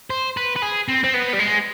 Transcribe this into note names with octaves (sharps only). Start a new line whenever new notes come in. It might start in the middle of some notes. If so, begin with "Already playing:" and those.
C5
B4
B4
G#4
C4
C4
B3
G3
G#3